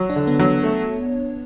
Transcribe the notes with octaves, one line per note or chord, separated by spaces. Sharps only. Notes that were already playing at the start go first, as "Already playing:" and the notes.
Already playing: F#3 C#5
D4
D3
B3
F#3
A3